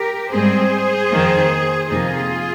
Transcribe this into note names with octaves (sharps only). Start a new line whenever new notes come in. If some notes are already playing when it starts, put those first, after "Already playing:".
Already playing: G4 A#4
G#2 G3 C4 G#4 C5
F2 D#3 A#3
F2 C3 F3 A#3 D#4 F4 G#4